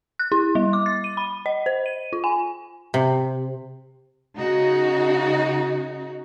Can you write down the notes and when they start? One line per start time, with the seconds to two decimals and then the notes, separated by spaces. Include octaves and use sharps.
0.19 F#6
0.32 E4
0.55 G3
0.73 D6
0.86 A6
1.04 D#7
1.17 B5
1.46 D#5
1.66 C5
1.86 D#7
2.13 F4
2.24 G#5
2.94 C3
4.37 C#3 D#4 F#4